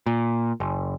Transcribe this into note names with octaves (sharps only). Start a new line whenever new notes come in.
A#2
F#1